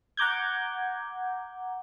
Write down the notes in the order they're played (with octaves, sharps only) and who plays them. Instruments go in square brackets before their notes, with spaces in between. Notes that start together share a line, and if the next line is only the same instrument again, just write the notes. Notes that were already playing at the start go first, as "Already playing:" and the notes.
[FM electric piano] F#5 A#5 D6 G6 G#6